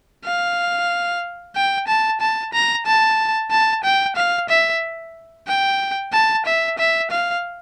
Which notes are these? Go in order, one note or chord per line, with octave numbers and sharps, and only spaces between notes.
F5
G5
A5
A5
A#5
A5
A5
G5
F5
E5
G5
A5
E5
E5
F5